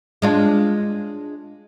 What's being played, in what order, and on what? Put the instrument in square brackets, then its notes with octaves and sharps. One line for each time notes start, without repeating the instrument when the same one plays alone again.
[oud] G#3 D4 F4